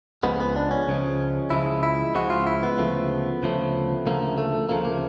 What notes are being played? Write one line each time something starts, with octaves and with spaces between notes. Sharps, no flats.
C#2 C#3 F3 G#3 B3
B3
D4
C#4
C#2 C#3 F3 G#3
C#2 C#3 F3 G#3 E4
E4
C#2 C#3 F3 G#3 F#4
F4
E4
B3
D2 C#3 F3 A3
D2 C#3 F3 A3
D2 C#3 F3 A3 A#3
A3
D2 C#3 F3 A3 A#3
A#3